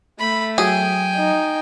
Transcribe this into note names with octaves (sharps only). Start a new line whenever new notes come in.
A3 B5
F#3 G#4 G5 G#5
D#4